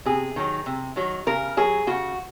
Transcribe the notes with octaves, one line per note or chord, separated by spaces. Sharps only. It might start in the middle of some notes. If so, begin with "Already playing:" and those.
C3 G#4
D#3 F#3
C3
D#3 F#3
C#3 A#4
F#3 G#4
C#3 F#4